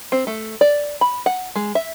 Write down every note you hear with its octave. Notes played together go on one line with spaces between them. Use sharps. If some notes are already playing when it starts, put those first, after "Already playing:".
C4
A3
D5
B5
F#5
G#3
E5